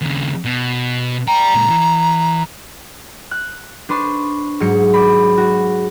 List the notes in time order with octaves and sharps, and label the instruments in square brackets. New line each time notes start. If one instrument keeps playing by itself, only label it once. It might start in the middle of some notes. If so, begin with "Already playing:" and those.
[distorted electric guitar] D#2 C#3
B2
[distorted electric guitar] D5 G5 [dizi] A#5
[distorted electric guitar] A#2 G#3
E3
[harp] F#6
D4 B4 C5 C6 C#6
G#2 F#3 C#7
D5 B5
F#4